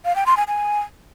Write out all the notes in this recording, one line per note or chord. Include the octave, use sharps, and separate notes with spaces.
F5
G5
C6
G#5
G#5